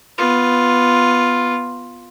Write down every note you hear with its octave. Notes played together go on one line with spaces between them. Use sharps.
B3 F4